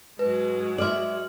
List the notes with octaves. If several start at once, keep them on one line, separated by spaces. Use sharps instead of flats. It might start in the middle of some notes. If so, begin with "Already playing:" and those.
G#2 F#3 G#3 B4
D5 E5 C6 F6 F#7